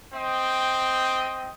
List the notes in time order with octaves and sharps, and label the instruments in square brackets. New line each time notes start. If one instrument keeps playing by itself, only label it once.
[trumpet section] C4 D#5 G5